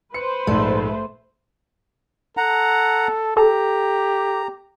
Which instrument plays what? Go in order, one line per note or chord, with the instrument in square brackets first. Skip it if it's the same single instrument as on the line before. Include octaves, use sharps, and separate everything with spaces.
[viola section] B4 C5 [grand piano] C#7
[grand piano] A#1 G#2 [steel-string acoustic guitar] A3
[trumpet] A4 [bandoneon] F#5 A#5
[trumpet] G4 [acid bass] A4 [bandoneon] A#5